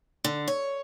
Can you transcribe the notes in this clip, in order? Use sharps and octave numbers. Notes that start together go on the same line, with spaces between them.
D3
C#5